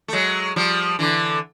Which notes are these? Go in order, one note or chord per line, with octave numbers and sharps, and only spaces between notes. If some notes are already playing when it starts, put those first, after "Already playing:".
A3
F#3 G#3
F3 G3
D3 E3